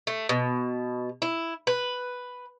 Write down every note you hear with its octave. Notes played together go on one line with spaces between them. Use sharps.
A3
B2
E4
B4